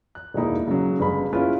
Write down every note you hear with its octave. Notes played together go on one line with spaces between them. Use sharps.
F#6
E1 D#2 A#3 D#4 E4
C#3 F#3
G1 G#3 B5
C#4 E4 F4 G#4 B4